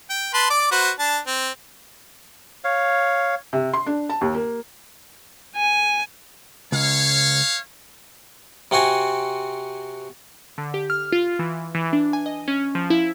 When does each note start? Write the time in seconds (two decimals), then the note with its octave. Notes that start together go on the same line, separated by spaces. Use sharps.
0.10 G5
0.34 B4 A5 C6
0.50 D5 D6
0.71 F#4 B4 C5
0.99 D4 A5
1.27 C4
2.64 C#5 F5
3.53 C3
3.74 C6
3.86 D4
4.10 A5
4.21 D#2
4.35 A#3
5.56 G#5
6.72 C#2 C#5 F5
8.71 C3 C4 F#4 G#5
10.58 D3
10.74 G4
10.90 F6
11.12 F4
11.39 E3
11.75 E3
11.93 D4
12.13 G#5
12.26 D#5
12.48 C#4
12.75 F3
12.90 E4